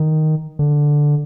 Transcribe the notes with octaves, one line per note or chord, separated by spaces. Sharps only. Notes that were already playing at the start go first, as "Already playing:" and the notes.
Already playing: D#3
D3